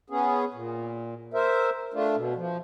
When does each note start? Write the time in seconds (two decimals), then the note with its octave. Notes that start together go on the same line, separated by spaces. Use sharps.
0.10 B3 C#4 G#4
0.54 A#2
1.34 A#4 C5 E5
1.94 A3 D4 F4
2.16 B2
2.35 F3